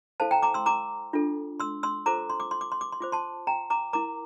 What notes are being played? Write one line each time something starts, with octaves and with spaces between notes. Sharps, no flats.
E4 A4 C5 F5 A5
G5 A#5
A#5 D6
C6 E6
A#5 D6
D4 F4 A4
C6 E6
C6 E6
F4 A4 C5 A#5 D6
C6
D6
C6
D6
C6
D6
C6
F4 C5 D6
A5 C6
G5 A#5
A#5 D6
E4 A#4 A#5 D6